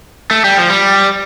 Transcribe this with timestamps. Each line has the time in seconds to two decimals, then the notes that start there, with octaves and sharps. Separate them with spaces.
0.31 A3
0.44 G3
0.57 F3
0.69 G3